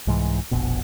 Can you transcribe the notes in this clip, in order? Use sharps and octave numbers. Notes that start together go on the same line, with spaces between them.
C2 G#2 E3
F1 A#1 B2